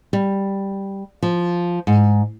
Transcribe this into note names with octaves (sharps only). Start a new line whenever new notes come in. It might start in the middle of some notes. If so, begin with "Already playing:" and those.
G3
F3
G#2